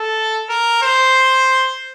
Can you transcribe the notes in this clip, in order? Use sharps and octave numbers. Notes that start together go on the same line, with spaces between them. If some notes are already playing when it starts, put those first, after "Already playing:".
Already playing: A4
A#4
C5